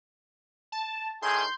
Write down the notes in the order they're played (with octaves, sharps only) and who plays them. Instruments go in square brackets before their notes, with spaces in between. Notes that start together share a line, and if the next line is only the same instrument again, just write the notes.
[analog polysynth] A5
[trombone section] A2 D#3 G#4 [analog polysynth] C6 G6